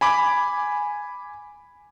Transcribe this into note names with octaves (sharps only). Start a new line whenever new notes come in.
G#5 B5 D6